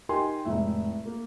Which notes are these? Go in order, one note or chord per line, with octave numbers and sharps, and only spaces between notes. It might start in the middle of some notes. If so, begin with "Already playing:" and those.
D#4 G4 A#4 G5 G#5 C6
F1 A2 G#3 E5
A#3